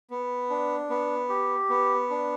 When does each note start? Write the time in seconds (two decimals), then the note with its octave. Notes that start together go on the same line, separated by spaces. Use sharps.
0.11 B3
0.50 D4
0.90 B3
1.29 G4
1.69 B3
2.10 D4